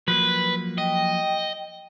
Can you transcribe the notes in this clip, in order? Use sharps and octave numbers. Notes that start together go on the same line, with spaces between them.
F3 F#3 A#3 B4
D#5 G5